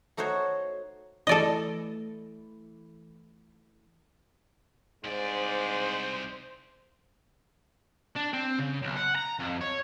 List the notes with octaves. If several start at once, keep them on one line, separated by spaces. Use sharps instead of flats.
A3 D#4 F#4 C5 C#5
E3 A3 A4 D5 D#5
C2 G#2 C5 D5
D4
C4
C#3
B1
F#5
A#5
F2
C#5